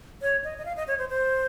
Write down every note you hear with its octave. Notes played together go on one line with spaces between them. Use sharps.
C#5
D#5
D#5
F5
D#5
C#5
C5
C5